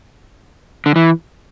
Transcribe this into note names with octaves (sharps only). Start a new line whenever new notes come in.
D3
E3